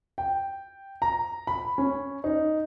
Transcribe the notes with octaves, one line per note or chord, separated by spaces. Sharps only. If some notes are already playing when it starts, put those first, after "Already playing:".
G5
A#5
B5
C#4
D#4